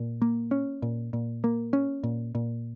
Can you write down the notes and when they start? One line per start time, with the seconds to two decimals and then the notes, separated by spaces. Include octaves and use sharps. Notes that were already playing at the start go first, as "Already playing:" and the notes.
Already playing: A#2
0.22 A#3
0.51 C#4
0.82 A#2
1.13 A#2
1.44 A#3
1.73 C#4
2.04 A#2
2.35 A#2